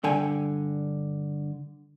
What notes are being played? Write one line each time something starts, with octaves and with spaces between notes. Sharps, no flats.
G2 D3 G5 G#5